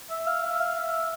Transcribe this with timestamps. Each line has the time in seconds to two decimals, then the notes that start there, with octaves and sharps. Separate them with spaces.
0.10 E5
0.27 F5
0.44 E5
0.60 F5
0.77 E5